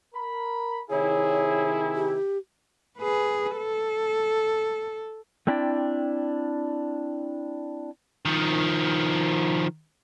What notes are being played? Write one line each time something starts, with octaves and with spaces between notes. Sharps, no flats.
A#4 B5
C3 D#3 E4 G#4 C#5
G4
G#4 B4
A4
A3 C4 D4 E4 D5 G5
D#3 F3